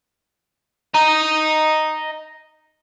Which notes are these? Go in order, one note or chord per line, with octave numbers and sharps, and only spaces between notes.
D#5 A#5